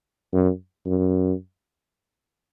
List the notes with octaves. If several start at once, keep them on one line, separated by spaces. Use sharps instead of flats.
F#2
F#2